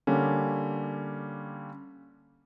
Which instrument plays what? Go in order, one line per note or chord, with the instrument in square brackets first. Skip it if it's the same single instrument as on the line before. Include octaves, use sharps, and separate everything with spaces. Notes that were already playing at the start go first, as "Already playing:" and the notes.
[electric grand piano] D3 G3 A#3 C#4